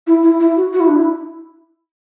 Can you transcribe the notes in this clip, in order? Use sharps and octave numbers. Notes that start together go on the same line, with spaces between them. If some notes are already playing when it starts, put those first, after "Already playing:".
E4
E4
E4
F#4
F#4
E4
D4
E4